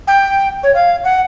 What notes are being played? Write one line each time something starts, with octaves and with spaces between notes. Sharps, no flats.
G5
C#5
F5
F#5